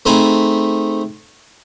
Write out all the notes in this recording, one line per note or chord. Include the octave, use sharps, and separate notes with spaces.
A3 C4 D#4 G#4 B5